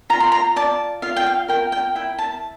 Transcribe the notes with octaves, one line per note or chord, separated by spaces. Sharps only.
F4 A#5
C6
A#5
D5 A5
F4 F5
G5
F5
A#4 G5
G5
E4 G5
A5